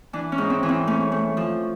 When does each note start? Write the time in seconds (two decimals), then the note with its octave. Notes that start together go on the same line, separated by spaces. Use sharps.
0.13 E3 D4
0.32 C#4
0.38 G#2
0.50 C4
0.63 E3
0.69 C4
0.87 A3 C#4
1.12 A3
1.37 F3